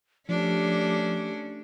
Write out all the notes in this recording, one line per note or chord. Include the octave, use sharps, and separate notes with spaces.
F3 A3 C#4 D4 G4